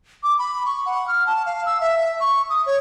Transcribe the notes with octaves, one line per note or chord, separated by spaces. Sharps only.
D6
B5
C#6
F#5
F6
A5
F5
E6
E5
C#6
D#6
C#5